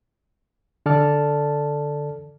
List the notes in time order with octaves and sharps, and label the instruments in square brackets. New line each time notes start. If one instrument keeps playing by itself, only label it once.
[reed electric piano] D3 A4 D5 A5 F6